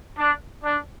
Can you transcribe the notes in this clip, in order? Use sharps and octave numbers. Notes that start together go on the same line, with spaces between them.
D4
D4